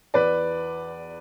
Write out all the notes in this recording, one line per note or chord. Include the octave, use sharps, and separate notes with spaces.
E2 B4 D5